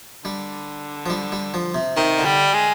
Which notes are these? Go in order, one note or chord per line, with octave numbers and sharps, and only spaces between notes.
D3 G3
F3
G3
G3
F3
C3
C3 D#3
D3
G3
G#3